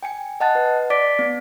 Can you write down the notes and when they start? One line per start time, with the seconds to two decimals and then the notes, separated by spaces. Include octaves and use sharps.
0.03 G5 G#5 C#7
0.40 D#5 F#5 A5 F#6 A6
0.55 B4
0.90 D5 D6 A6 B6 D7
1.19 B3